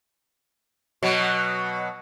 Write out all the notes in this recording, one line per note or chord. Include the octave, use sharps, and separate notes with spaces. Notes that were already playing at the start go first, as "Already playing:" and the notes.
B2 F#3